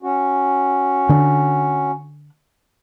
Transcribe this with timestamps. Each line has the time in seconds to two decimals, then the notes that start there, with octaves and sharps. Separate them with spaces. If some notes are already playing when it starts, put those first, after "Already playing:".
0.03 C#4 F#4
1.09 D3 D4